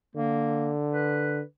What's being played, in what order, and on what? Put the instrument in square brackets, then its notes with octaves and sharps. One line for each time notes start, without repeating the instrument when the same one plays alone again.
[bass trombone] D3 [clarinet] A#3
[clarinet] B4